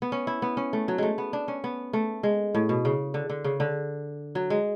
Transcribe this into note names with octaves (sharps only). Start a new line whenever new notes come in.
B3
C#4
E4
B3
C#4
A3
F#3
G#3 A3
B3
D4
C#4
B3
A3
G#3
A2
B2
C#3
D3
D3
C#3
D3
F#3
G#3